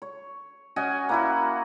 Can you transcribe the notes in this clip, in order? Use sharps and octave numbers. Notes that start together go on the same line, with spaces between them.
C#5
C#4 F#4 D#5 G#5
A#3 E4 F#4